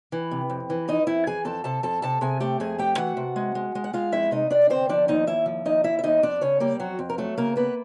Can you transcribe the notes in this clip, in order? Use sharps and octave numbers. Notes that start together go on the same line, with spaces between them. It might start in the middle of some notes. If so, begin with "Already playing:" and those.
E3
C3
F2
E3
F2 D#4 D#5
F2 E4 E5
E3 G#4 G#5
F2 A4 A5
C3 A4 A5
F2 A4 A5
C3 A4 A5
C3 G#4 G#5
A3 G4 G5
F2 G#4 G#5
A3 G4 G5
E3 F#4 F#5
C3
G#3
G#3
G#3
F#5
G#3 F4 F5
F2 E4 E5
C3 D#4 D#5
C3 D4 D5
D3 C4 C5
F3 D4 D5
D#2 D#4 D#5
D#2 E4 E5
F3
D#2 D#4 D#5
D#2 E4 E5
E5
D#2 D#4 D#5
F2 D4 D5
C#3 C#4 C#5
G3 A#3 G4
F2 F#3 F#4
F2
A#4
F#3 A3 A4
C#3 A#3 A#4
A#3 B3 B4